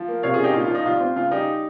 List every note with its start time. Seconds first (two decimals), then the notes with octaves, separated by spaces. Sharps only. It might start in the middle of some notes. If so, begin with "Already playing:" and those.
Already playing: F3
0.08 A#3
0.23 C3 C#5 F5
0.34 F4 G#4
0.38 C#4
0.44 D#4 G4
0.54 A#2 F4
0.64 F4
0.70 F3 D#4
0.86 C2 F4
1.00 C4
1.16 C#3 F4
1.31 G3 D#4 G4